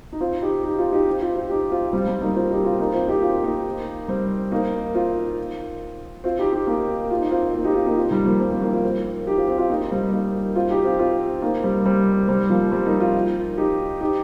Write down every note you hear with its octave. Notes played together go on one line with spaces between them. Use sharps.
D#4
C4 F4
D#4 G4
D#4 G4
C4 F4
D#4 G4
C4 F4
C4 F4
D#4 G4
C4 F4
G3 C4
G3 C4
A#3 D#4
C4 F4
D#4 G4
C4 F4
A#3 D#4
C4 F4
D#4 G4
C4 F4
A#3 D#4
G3 C4
A#3 D#4
C4 F4
C4 F4
D#4 G4
D#4 G4
A#3 D#4
F4
D#4
C4 F4
A#3 D#4
D#4 G4
C4 F4
A#3 D#4
C4 F4
D#3 G3
F3 A#3
G3 C4
G3 C4
A#3 D#4
C4 F4
C4 F4
D#4 G4
C4 F4
C4 F4
C4 F4
A#3 D#4
G3 C4
A#3 D#4
C4 F4
D#4 G4
C4 F4
C4 F4
A#3 D#4
G3 C4
G3 C4
G3 C4
F3 A#3
G3 C4
A#3 D#4
C4 F4
D#4 G4
D#4 G4